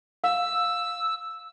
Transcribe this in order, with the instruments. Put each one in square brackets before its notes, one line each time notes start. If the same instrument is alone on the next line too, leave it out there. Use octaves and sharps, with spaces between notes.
[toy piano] F5 [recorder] E6